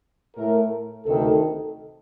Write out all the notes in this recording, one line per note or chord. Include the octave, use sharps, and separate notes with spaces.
A2 A3 A#4
D2 C3 D#3 A4